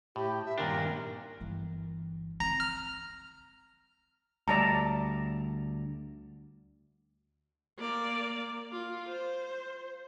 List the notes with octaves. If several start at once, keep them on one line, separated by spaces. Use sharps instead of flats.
A2 G4
E5
G2 A#2 D#3 D4 G4 A#4
G1 E3
C4 A#5
F6
D2 G3 D5 A5 A#5
A#3 D5
F4
C5